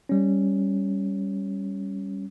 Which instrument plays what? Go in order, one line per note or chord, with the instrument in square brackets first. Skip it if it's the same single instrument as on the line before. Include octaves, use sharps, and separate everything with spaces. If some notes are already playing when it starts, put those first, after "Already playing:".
[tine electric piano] G3 C#4